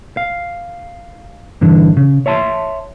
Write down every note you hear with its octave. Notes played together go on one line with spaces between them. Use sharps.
F5
G2 D3 E3
C#3
C#5 E5 A5 C6